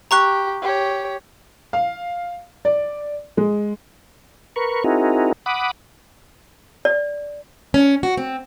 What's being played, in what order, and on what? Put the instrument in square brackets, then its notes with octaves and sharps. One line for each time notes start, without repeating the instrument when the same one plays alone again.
[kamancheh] G4 [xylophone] A#5 C#6 F#6
[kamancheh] G4 C#5
[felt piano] F5
D5
G#3
[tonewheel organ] A#4 B4 C#6
C4 D#4 E4 F#4 G#4 A#4
F#5 B5 D6 D#6
[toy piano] D5
[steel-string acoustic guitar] C#4
F#4
C4